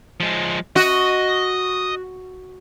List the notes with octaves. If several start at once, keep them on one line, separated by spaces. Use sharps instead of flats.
F3 G#3
F#4 D#5